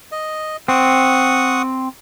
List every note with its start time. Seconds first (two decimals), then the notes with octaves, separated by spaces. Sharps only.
0.12 D#5
0.68 C4 F#5 C#6 D#6